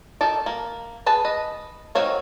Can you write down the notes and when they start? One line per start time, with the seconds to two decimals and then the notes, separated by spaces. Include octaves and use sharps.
0.21 D#3 A4 D5
0.46 A#3
1.06 G#4 B4 A5
1.25 B4 D#5
1.95 D#3 C4 F#4 C#5 F5